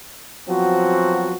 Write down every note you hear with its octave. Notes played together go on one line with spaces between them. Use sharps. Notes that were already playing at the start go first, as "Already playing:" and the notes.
F3 F#3 B3 C4 F#4